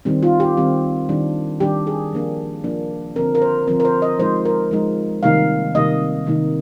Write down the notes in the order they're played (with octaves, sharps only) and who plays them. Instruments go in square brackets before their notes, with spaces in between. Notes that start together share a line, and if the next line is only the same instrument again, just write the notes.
[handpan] D#3 G3 C4
F4
G4
D#3 G3 C4
D#3 G3 D4
D#3 G3 D4 G4
G#4
F3 A#3 D4
F3 A#3 D4
D3 F3 C4 A#4
A#4
C5
D3 F3 C4 A#4
A#4
C5
D#5
F3 G#3 D#4 C5
A#4
F3 G#3 D#4
C3 D#3 G3 A#3 D#4 F5
C3 D#3 G3 A#3 D#4 D#5
C3 D#3 A#3 D#4